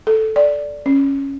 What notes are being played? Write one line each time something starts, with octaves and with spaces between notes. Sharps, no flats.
A4
D5
C#4